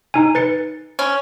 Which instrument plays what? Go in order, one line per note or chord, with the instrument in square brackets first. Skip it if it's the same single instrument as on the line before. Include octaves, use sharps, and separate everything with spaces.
[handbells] D#4 G#5
B4 A6 C#7
[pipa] C#4